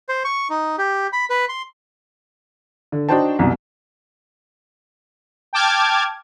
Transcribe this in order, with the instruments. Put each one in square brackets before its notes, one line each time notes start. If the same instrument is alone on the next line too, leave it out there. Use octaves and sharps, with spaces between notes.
[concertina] C5
C#6
D#4
G4
B5
B4
C6
[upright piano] D3
D4 D#4 F#4 C5 G5 A5
C2 F#2 B2
[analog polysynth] G5 A5 D6 F6 G#6